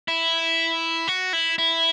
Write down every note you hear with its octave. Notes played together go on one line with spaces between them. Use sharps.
E4
F#4
E4
E4